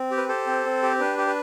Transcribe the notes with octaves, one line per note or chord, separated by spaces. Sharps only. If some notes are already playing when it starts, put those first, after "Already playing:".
Already playing: C4
G4
B4
G4 A4 C5
C4
C4
G4
D4 B4
G4
B4